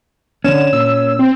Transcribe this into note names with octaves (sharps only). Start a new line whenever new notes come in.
D3 C#4 E7
A#2 E6
C4